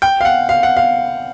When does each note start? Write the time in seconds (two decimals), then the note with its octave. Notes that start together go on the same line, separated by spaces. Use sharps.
0.02 G5
0.21 F5
0.25 F#5
0.49 F5
0.63 F#5
0.77 F5